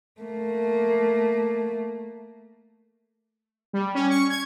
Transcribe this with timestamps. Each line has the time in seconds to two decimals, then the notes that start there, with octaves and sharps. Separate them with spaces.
0.21 A3 A#3
3.73 G3
3.95 C#4
4.10 C#6
4.30 G#6